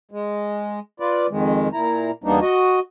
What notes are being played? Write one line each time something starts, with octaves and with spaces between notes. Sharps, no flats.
G#3
F4 B4 D5
F2 D#3 G#3
A#2 E4 A#5
E2 G3 A#3 B3 D4 D#4
F#4 D#5